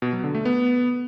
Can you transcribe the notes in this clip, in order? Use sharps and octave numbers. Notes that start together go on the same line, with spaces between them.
B2
F#3
D3
A3
B3